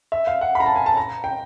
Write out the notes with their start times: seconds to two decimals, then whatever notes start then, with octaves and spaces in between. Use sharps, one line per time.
0.12 E5
0.27 F5
0.41 F#5
0.55 B5
0.60 A#5
0.66 A5
0.76 G#5
0.86 A5
0.97 A#5
1.24 G5